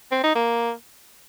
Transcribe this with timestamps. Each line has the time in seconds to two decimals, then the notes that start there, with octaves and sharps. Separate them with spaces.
0.11 C4
0.23 D#4
0.35 A#3